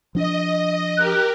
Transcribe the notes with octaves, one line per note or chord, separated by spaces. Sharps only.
F3 D4 D#5
G4 A#4 F#6